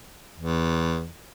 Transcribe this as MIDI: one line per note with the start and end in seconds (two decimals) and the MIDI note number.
0.37 1.08 40